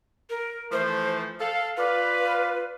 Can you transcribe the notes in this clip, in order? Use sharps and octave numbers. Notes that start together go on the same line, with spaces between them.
A#4
E3 F3 A3 C5
A4 F5
F4 B4 D5 F5